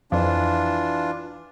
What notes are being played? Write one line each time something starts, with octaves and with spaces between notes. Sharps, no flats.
F2 E3 D4 F4